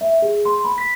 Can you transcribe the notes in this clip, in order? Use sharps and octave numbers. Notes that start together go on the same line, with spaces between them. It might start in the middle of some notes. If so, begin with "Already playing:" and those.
E5
G#4
C6
B5
B6